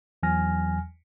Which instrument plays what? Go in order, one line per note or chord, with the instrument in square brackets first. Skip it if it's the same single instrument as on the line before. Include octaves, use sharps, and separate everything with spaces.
[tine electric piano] E2 E3 F#3 G#5 F6 A#6